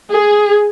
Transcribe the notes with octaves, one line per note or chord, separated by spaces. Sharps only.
G#4